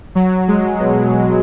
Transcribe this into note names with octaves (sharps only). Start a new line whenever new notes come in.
F#3
G#3
B2